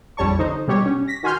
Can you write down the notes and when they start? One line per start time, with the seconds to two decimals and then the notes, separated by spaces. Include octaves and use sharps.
0.17 A#1 F2 G3 C#5 A5 C#6
0.39 D3 D#4 C5
0.68 B2 G3 G4 C#5
0.86 C#4
1.08 A#6 B6
1.23 D#3 F#4 G#5 C6 F6 G6